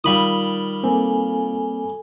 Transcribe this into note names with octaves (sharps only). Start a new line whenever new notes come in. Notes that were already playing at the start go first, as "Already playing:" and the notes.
D#3 G3 F4 B5 D#6
A#3 C4 A4 G#5